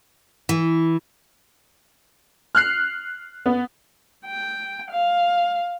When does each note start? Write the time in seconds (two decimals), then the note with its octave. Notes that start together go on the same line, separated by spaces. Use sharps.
0.49 E3
2.55 F6 F#6 C7
3.46 B3
4.26 G5
4.91 F5